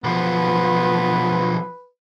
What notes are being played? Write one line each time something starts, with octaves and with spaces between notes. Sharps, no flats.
B1 F3 B3 B4